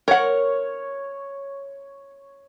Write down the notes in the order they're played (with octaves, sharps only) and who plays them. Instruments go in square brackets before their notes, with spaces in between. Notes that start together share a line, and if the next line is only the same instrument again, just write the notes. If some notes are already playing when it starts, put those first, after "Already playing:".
[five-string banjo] A#4 F#5 [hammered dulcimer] C#5